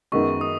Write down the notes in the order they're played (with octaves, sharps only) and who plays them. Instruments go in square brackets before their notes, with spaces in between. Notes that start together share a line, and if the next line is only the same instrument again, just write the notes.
[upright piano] F#2 D#3 G#3 B3 D#4 [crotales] C#6
[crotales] D#6